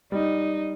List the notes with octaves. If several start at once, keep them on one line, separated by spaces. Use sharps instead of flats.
G3 D#4